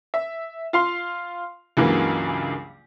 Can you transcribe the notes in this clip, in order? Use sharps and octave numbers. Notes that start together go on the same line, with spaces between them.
E5
F4 F5 C6
C#2 G2 C#3 E3 F#3 A#3